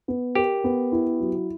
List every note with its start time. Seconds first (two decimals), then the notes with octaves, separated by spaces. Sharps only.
0.08 B3
0.35 G4 A#4
0.64 B3
0.92 E4
1.20 F#3